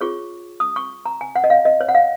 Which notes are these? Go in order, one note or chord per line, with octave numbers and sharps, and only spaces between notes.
F4 G#4 C#5 C#6
D#6
C#6
A#5
G#5
F#5
D#5
F5
D#5
C#5
F#5
F5